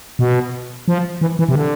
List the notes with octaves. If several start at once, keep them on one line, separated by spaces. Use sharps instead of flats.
B2
F3
E3
E3
C3
D3